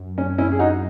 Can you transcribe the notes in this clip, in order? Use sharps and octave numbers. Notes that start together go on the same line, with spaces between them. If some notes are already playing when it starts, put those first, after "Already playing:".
Already playing: F#2
C#4
C#4 E4
G#4
D#4 F#4